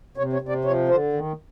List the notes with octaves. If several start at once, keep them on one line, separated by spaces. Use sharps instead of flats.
C3 C#5
C#5
C3
D5
F3 C#5
D3 C5
D#3